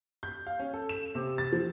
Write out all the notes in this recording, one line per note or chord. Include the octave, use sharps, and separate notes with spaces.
G6
F5
C#4
A4
E7
C3
A6
F3